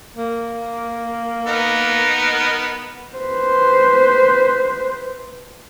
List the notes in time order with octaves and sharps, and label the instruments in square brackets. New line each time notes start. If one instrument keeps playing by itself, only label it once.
[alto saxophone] A#3
[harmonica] B3 D#4 A#4
[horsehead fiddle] B4 C5